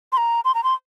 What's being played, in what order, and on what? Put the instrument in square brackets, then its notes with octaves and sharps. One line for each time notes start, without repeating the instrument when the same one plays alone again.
[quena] C6
A#5
C6
A#5
C6